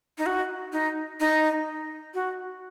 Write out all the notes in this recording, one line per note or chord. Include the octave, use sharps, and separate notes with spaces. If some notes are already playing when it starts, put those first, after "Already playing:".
D#4
F#4
D#4
D#4
F#4